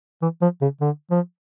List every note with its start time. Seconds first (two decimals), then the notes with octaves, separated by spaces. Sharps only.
0.22 E3
0.42 F3
0.61 C#3
0.81 D3
1.11 F3